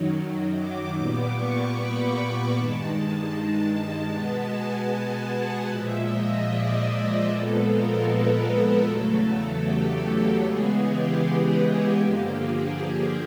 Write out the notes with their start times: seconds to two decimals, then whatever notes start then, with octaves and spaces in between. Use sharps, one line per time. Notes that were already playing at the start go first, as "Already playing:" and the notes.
Already playing: F#2 D#3 F#3
0.56 D6
0.96 A#2 G3 B3
1.35 C#6
1.75 B5
2.53 G2 D#3 G#3 A5
2.93 A5
3.72 A5
4.11 B2 G#3 B3
4.51 G#5
5.29 F#5
5.69 A#2 F3 G#3 E5
6.09 D#5
6.48 D5
7.26 A#2 F3 G#3 B3 A4
7.66 A#4
8.06 B4
8.45 A#4
8.84 E2 C#3 F#3 A3 A4
9.63 G4
10.03 A4
10.42 C#3 E3 G#3 B3 G#4
10.81 G4
11.99 G2 D3 F3 A#3 G4
12.39 G#4
12.79 G#4